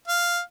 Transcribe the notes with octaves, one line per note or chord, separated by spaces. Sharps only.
F5